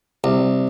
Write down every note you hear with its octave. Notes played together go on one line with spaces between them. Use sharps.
C2